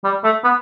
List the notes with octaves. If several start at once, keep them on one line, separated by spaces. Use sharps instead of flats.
G3
A3
B3